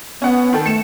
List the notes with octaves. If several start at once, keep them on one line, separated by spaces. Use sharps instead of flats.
B3 C#4 F#5
D#3 A4
A3 C#7 E7